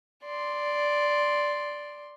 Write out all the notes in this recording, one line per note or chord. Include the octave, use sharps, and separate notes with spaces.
D5 C6